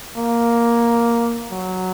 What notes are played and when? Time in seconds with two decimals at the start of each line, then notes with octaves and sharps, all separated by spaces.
0.17 A#3
1.52 F#3